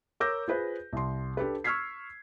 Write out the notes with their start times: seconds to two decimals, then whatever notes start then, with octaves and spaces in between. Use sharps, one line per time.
0.20 A#4 C#5 D6 E6 G6 A#6
0.48 F4 G#4 B4 C5
0.93 C2 C6
1.37 D4 G4 A4 B4
1.64 C#6 E6 F6 G#6 B6 C7